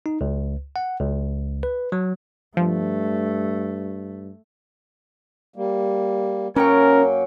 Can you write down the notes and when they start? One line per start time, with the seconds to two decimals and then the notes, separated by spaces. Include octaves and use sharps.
0.06 D#4
0.21 C#2
0.76 F#5
1.00 C#2
1.63 B4
1.92 F#3
2.57 G2 F3 A3
5.56 G3 A#3
6.56 F#2 A#3 C#4 A#4 G5 C#6